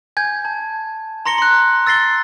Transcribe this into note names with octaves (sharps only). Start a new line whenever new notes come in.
G#5 G6 G#6
A5
A#5 C6 A#6 C#7 G7
C6 F#6
E6 A6 A#6 C7 G7